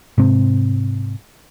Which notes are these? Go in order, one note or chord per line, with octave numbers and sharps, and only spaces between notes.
G#2 C3 C4